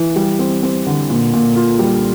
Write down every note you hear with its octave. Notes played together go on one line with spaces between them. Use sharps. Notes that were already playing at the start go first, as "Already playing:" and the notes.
Already playing: E3
G3
C4
C4
D3
A#2
A#2
F4
G3